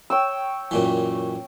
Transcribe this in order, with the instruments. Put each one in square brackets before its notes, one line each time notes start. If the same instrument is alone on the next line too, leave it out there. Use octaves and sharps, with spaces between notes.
[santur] C#5 G5 E6
[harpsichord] F#2 A#2 E3